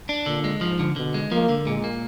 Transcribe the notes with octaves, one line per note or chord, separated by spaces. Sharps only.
D4
A#2 D3
G#3
G#2 F3
D3
B2 D3
G#3
F3 A#3
D3
A#2 G#3
A#3